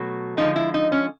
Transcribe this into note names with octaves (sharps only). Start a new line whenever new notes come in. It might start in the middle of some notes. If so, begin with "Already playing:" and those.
Already playing: B2 F#3 A3
D3 F3 G#3 D#4
E4
D#4
C#4